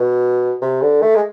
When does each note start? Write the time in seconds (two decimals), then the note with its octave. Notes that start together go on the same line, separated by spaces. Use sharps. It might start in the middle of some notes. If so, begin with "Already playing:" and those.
Already playing: B2
0.62 C3
0.81 D3
1.02 A3
1.16 G#3